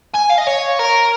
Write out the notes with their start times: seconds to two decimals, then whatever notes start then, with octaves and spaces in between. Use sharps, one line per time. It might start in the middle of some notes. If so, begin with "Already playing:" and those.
0.14 G#5
0.30 F5
0.38 D#5
0.47 C#5
0.79 A#4